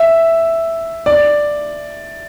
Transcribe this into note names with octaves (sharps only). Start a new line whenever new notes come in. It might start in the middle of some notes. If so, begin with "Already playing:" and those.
Already playing: E5
D5